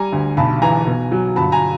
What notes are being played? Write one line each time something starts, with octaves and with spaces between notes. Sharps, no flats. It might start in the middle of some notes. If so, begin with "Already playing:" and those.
Already playing: G3 G#5 A#5
D2
B1 A5 B5
E3 G#5 A#5
B2
F#3
G1 A5 B5
G#5 A#5